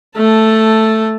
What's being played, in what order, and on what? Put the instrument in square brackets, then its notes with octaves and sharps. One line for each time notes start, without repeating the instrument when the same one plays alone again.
[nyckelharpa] A3 A5